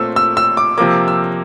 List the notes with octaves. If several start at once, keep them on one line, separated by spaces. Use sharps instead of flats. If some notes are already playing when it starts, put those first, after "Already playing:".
Already playing: A#2 A3 C4 E6
E6
E6
D6
C3 F3 A#3 D6
E6